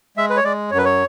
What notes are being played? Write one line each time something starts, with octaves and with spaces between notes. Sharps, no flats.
G#3 E5
B4
C#5
G#3 D5
F#2 C#5
B4
C#5